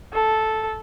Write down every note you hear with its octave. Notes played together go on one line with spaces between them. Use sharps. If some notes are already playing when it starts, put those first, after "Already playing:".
A4